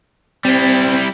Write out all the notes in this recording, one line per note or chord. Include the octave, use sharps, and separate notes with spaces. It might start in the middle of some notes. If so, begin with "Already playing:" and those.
G3 C4 E4